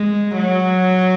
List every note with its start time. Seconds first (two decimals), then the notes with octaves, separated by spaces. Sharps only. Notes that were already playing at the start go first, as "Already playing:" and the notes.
Already playing: G#3
0.37 F#3